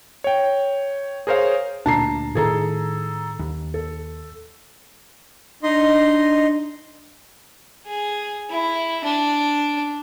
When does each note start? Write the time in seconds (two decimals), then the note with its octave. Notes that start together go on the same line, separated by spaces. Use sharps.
0.24 C#5 G5
1.27 G#4 A#4 C5 C#5 F5
1.86 D2 A#2 D4 A5 A#5 C7
2.35 A2 D#3 G#4 A4 A#5
3.39 D#2
3.74 A4
5.63 D4 D#4 D#5 C6
7.86 G#4
8.50 E4
9.04 D4